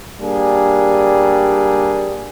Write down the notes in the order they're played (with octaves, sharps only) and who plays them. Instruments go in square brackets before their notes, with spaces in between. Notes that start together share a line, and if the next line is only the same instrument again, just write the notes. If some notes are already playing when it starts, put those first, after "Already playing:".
[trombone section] G3 A#3 D4 G4 G#4